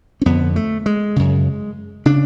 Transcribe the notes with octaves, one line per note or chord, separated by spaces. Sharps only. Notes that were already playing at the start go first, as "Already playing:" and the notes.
C#4
F2 D3 B3
A3
G#3
F#2 C#3
C#3 D4